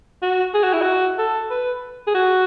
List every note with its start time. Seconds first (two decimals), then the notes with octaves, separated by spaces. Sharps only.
0.22 F#4
0.54 G#4
0.63 F#4
0.73 E4
0.82 F#4
1.18 A4
1.50 B4
2.07 G#4
2.14 F#4